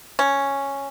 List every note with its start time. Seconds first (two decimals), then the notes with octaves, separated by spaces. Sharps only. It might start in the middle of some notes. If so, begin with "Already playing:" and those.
0.19 C#4